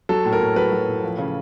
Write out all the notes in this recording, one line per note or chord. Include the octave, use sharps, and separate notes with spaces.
F#3 A4
A2
A#4
A2
F#3 B4
F#3
A2
F3
C#3